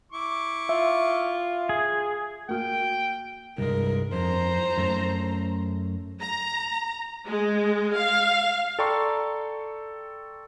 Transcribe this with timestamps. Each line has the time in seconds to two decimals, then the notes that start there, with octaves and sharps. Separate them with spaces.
0.12 E4 C#6 D6
0.69 F4 E5
1.69 G#4
2.49 A#3 F#4 G5 F6
3.58 C2 G2 G#3 A#4
4.13 F2 C5 A#5
4.78 F#2 A3
6.20 A#5
7.26 G#3
7.95 F5
8.79 A4 D5 G5 A#5 C6 C#6